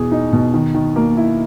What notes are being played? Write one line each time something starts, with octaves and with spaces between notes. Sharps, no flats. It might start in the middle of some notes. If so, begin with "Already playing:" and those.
Already playing: E2 B2 G#4
D#4
B2
D#3
D#3
A#3
E4